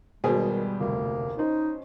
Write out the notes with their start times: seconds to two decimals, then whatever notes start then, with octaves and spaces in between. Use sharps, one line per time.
0.24 G#1 B2 D#3 G3 G#4
0.80 F1 D2 A#3
1.38 C#4 D#4 C5 D#5